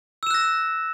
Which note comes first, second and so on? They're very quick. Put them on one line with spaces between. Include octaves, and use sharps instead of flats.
E6 E7 F#6 A#6